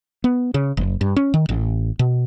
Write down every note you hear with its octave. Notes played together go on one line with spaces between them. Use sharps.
B3
C#3
F#1
G2
C#4
D#3
A1
B2